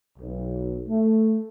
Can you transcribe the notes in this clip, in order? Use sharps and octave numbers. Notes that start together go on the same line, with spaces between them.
B1
A3